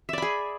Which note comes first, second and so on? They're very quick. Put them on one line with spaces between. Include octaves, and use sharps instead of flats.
E5 D5 B5 G#4